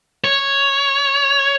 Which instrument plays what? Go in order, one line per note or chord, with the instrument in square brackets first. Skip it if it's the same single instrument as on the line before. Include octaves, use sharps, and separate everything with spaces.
[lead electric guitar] C#5